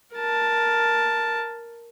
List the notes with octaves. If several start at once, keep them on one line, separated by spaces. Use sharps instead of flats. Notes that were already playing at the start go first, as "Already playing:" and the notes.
A#4 A5